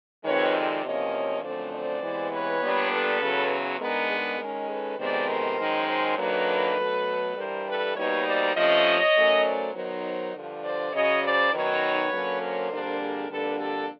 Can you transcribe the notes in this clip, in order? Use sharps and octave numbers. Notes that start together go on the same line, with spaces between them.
F2 C3 D#3 G#3 B4 C#5
C5 D5
E2 C3 F3 A#3 C#4 C#5 D#5
F#2 D3 F3 A3 C4 C5 D5
C5 D5
C3 E3 G#3 B3
B4 C#5
A#2 G3 B3 D4
A4 B4
E2 C#3 F#3 B3
D#3 G#3 B3 D4 G#4 A#4
G#4 A#4
D#3 G#3 C#4
A4 B4
F2 C3 D#3 G#3 B3 C5 D5
A#4 C5
F#2 D#3 G#3
A#4 C5
D#3 F#3 A#3 D4 A4 B4
B2 F#3 A3
G2 E3 G3 A#4 C5
A4 B4
B2 G3 A#3 D#4 B4 C#5
C5 D5
C3 F3 A3 C#4 C#5 D#5
D#3 F#3 A3 C#4
C5 D5
D#3 F#3 B3 D#4 A#4 C5
G2 D3 F3
C5 D5
F#2 C#3 F#3 C#5 D#5
C5 D5
F#2 D#3 F#3 B3 D#4 B4 C#5
D3 F#3 A#3 C#4
A#4 C5
F2 D3 G3 A#3 D4
G#4 A#4
F2 D3 G3 A#3 D4 A4 B4
G4 A4